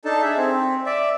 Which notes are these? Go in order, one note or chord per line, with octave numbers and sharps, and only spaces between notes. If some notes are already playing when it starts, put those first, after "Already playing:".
D4 D#4 A4 A5
G#4 E5
C4
D5 E5